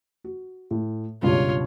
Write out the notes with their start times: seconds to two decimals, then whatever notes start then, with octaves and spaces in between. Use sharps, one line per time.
0.24 F#4
0.71 A2
1.22 C#2 G2 B2 F4 C#5